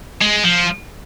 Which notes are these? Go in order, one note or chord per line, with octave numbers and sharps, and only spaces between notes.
G#3
F3